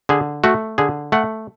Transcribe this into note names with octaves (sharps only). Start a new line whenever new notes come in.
D3 G#4
A3 F#4
D3 G#4
A3 F#5